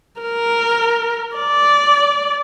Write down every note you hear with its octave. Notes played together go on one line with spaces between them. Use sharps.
A#4
D5